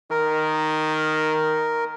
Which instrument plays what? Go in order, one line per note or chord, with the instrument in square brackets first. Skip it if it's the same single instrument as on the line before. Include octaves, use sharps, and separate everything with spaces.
[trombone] D#3 [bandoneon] A#4